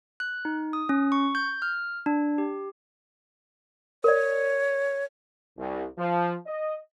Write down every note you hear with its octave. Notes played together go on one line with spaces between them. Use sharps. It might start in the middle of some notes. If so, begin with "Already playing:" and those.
F#6
D#4
D#6
C#4
C#6
G6
F6
D4
G4
A#4 C#5 D5
C2
F3
D#5